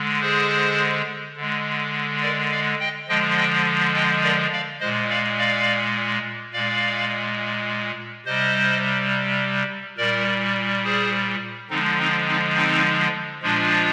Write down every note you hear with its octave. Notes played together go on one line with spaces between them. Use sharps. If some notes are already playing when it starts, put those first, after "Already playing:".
Already playing: D3 G#3
G#4 C5
D3 G#3
A#4 D5
D5 F5
D#5 G5
D3 F3 G#3 D#5 G5
D#5 G5
D#5 G5
A#4 D5
D5 F5
A#2 G#3 C5 D#5
D5 F5
D5 F5
A#2 G#3 D5 F5
C3 G3 C5 D#5
A#2 G3 A#4 D5
G#4 C5
D3 F3 G#3 C4 D#4
C4 D#4
C4 D#4
C4 D#4
A#2 F3 G#3 D4 F4